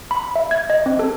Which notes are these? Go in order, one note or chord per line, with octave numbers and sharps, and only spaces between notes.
B5
E5
G#6
D#5
C4
A4